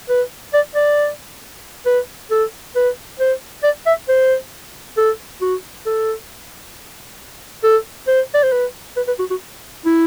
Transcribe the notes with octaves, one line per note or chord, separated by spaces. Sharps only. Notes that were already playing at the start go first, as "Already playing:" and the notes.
B4
D5
D5
B4
A4
B4
C5
D5
E5
C5
A4
F#4
A4
A4
C5
D5
C5
B4
B4
B4
F#4
F#4
E4